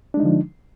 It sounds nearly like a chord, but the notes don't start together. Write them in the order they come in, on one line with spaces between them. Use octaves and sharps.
D4 G#3 D#4 D3 F3